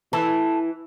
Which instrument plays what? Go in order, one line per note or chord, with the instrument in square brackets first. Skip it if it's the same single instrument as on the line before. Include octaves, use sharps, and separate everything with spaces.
[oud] E3 [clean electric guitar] A4